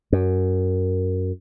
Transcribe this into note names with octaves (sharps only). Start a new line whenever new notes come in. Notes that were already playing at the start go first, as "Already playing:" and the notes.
F#2